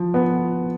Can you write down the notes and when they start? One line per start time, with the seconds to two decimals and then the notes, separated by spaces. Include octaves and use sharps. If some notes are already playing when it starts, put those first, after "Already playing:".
Already playing: F3
0.14 B3